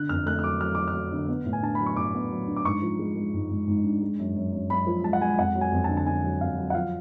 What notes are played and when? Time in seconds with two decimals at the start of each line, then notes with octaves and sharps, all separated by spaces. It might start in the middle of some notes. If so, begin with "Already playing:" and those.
Already playing: D3 F#6
0.09 F2 F6
0.26 A3 F#6
0.39 F6
0.43 F#3 D6
0.61 F#3 F6
0.75 F#3 D6
0.88 F6
0.94 F#3
1.12 D3
1.28 B3
1.46 A2
1.53 G#5
1.62 D4 A5
1.75 F#3 B5
1.86 C#6
1.96 A2 D6
2.14 B3
2.31 F#3
2.48 D4
2.56 D6
2.65 G#2 C#6
2.82 F3
2.99 G#3
3.16 G#3
3.34 G#2
3.51 G#2
3.67 G#2
3.84 D4
4.02 G#3
4.19 F#2
4.36 F#2
4.53 F#2
4.70 F#2 B5
4.87 F3
5.03 G#3 A5
5.13 F#5
5.21 G#3 G#5
5.38 F2 F#5
5.55 F#3
5.61 G#5
5.72 F2
5.84 A5
5.89 D3
5.97 A5
6.06 D3 G#5
6.24 F#3
6.40 F2 F5
6.58 F#3
6.70 F#5
6.75 F3 F5